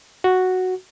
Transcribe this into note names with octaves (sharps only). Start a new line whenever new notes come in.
F#4